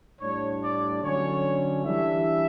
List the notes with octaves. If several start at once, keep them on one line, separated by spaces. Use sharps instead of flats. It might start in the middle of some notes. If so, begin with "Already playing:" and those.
A2 G3 D4 C#5
D5
D3 F#3 C#4 C#5
E3 G3 D4 E5